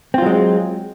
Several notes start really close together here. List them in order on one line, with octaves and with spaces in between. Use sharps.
C4 F4 F#3 G#3